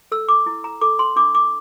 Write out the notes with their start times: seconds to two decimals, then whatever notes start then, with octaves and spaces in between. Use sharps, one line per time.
0.12 A4 E6
0.29 D6
0.46 E4
0.64 A#5
0.81 A4 D6
0.99 C6
1.16 D4 D6
1.35 D6